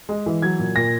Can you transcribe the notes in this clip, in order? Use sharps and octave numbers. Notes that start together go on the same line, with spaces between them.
G#3
E3
F#3 G#6
A#2
A#2 A#6